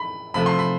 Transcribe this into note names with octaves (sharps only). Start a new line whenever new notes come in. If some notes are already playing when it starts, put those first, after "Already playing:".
Already playing: B5
C3 F3 A3 B5
C6
B5